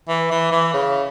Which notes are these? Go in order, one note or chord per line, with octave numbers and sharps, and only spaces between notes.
E3
E3
E3
C#3